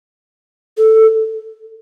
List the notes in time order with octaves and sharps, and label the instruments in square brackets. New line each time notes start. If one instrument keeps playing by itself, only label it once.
[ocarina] A4